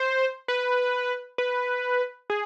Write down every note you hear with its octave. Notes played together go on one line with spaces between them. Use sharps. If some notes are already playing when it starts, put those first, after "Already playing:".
Already playing: C5
B4
B4
G#4